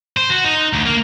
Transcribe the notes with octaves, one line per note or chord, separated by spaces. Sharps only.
C5
F#4
D#4
D2
A#3